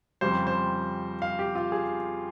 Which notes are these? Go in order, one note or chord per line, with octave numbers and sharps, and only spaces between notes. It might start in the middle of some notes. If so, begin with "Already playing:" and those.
F2 C#3 G3 C5
C5
F5
G4
F4
G#4